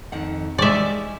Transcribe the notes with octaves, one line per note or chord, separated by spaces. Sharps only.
F2 D#3 F#5
G3 G#3 D#4 D5 E5